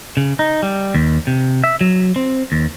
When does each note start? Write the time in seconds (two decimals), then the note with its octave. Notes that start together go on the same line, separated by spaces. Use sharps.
0.17 C#3
0.39 D#4
0.63 G3
0.95 D#2
1.27 C3
1.64 E5
1.81 F#3
2.16 C4
2.52 D#2